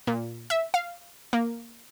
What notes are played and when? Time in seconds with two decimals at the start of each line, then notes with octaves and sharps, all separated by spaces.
0.07 A#2
0.50 E5
0.74 F5
1.33 A#3